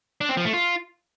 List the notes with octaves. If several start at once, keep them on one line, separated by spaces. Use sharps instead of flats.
D4
C4
F3
A3
F4